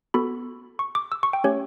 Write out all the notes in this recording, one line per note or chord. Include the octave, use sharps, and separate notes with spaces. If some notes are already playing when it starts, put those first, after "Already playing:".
B3 F#4 A4 B5
C#6
D6
E6
C#6
G5
A3 C#4 G4 C#5